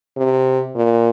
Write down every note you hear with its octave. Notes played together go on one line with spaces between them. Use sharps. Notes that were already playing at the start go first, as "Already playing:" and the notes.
C3
A#2